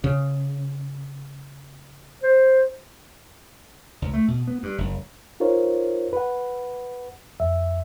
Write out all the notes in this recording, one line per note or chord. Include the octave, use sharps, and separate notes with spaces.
C#3
C5
C#2
A3
B2
B3
G2
F#1
D#4 F4 A#4 C5 C#5
B4 F#5
F2 E5